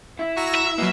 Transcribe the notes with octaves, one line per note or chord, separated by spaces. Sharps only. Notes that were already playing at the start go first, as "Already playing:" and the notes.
E4
F#4 A#5 E6 A#6
E5
B2 F#3 A#3